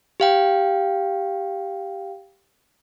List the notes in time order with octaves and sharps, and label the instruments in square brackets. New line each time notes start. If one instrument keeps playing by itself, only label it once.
[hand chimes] G4 F5 G5